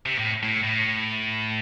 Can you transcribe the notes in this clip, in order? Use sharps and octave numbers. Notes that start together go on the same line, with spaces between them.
C3
A2
A2
A2